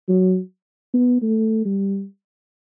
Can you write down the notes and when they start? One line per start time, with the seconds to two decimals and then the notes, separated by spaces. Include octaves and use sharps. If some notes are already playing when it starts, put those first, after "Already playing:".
0.09 F#3
0.94 B3
1.22 A3
1.65 G3